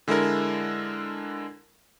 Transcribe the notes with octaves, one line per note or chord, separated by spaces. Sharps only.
D3 G#3 E4 A4 A#4